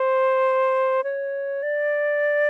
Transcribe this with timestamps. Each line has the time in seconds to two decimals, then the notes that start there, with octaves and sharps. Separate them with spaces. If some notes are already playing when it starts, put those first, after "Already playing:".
Already playing: C5
1.04 C#5
1.63 D5